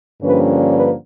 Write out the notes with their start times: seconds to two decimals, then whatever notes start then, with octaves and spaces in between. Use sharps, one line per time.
0.22 G2 D3 F3 A#3 C#4 B4
0.73 B4